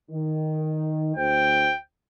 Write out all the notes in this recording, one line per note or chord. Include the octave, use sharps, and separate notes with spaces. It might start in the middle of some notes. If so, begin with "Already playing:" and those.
D#3
D2 C5 G5